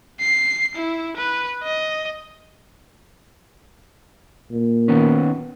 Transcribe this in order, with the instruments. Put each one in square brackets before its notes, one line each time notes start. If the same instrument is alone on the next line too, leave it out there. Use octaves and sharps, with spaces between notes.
[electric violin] C7
E4
B4
D#5
[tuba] A#2
[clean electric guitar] D#3 B3 C#4